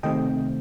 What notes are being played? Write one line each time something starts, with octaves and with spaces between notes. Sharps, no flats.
C3 D#3 A3 C4 D#5 G5